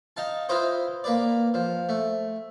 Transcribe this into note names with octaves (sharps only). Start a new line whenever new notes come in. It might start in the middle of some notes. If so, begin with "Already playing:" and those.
D#4 F5 A5
E4 F4 B4 C5 D#5
A#3 B4 D5
F3
A3